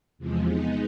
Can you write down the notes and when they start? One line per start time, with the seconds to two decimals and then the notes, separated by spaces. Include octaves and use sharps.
0.18 E2 C3 F3 G#3
0.47 G#3 B3 D#4